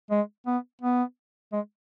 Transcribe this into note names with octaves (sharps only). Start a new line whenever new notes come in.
G#3
B3
B3
G#3